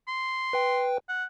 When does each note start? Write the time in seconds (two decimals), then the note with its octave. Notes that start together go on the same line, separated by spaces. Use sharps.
0.08 C6
0.53 B4 G5
1.09 F#5